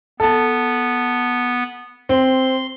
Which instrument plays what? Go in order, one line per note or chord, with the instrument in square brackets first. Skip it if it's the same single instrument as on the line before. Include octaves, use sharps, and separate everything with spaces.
[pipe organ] B3 [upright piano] A4 A5
[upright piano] C4 [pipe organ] C6